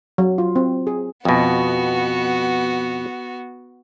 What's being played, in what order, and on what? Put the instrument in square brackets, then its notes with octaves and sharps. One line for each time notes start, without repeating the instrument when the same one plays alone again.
[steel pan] F#3
F4
C4
G#4
[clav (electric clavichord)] F2 B2 [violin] B3 F#4